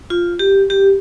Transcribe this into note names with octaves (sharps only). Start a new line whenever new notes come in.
F4
G4
G4